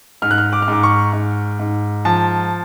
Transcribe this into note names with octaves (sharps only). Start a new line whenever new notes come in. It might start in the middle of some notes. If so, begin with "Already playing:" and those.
G#2 F6
F#6
F6
D6
F6
G#2 D6
C#6
G#2
G#2
F3 A5